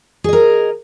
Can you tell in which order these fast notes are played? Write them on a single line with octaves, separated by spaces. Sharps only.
G#4 D#5 A#4